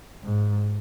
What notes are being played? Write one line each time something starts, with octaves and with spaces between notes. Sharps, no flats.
G#2